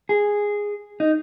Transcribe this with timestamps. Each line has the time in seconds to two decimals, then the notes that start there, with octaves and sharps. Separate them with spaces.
0.09 G#4
1.00 D#4